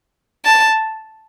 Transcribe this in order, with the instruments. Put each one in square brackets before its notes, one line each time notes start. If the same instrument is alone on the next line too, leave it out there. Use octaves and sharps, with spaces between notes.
[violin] A5